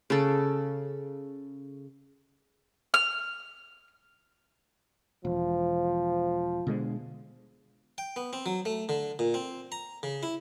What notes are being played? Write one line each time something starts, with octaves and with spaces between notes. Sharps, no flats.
C#3 A4
F6
E1 F3
B2 D3 G#3
G5
B3
C4
F#3
A3
D3
A#2
C4
A#5
C#3
E4